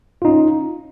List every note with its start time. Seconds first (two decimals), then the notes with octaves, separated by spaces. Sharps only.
0.22 F4
0.25 D#4
0.28 C#4